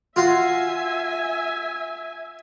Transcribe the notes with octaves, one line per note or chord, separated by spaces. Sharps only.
F4 F#4 E5 F5 G#5